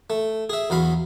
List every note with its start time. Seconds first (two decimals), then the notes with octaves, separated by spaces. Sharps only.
0.10 A3
0.50 G#4 E5
0.70 E2 F#3 F5 B5